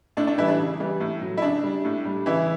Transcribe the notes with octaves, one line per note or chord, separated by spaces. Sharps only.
A2 D4
D4
E3 G3 E4
D4
C#3
E3 G3
A2
F#3
E4
C#3 D4
G3
A2
G3
C#3 E3 E4